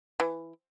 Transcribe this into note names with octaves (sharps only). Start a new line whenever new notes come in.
E3